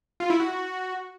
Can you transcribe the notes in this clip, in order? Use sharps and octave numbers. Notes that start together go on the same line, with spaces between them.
F4
E4
F#4